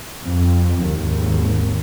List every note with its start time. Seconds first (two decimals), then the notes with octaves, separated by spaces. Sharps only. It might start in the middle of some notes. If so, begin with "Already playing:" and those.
0.24 F2
0.84 G#1 D#2